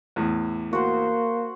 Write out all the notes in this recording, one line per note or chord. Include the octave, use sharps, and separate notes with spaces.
E2 A2
A#3 F#4 C5